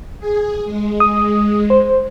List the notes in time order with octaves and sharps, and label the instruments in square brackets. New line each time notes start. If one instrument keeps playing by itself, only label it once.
[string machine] G#4
G#3
[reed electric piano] D#6
C5